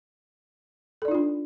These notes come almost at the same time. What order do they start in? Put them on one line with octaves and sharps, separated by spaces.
A4 D5 D#4 F4 D4